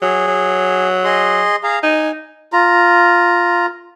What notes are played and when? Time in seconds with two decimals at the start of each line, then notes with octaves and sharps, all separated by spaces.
0.02 F#3 G#4
0.27 F#3
1.04 G#4 D#5 C6
1.63 G#4 F5 A#5
1.83 D#4 G#5
2.53 F4 A#5